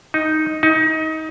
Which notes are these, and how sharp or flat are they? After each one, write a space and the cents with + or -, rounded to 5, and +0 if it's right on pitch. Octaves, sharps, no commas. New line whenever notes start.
D#4 +5
D#4 +25